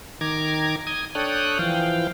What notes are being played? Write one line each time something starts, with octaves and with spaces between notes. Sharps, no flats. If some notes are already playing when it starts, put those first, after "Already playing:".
D#3 A#5 D6 G#6
D#6 G#6
D4 A4 C#5 G5 D#6 F#6
E3 F3 F5 G5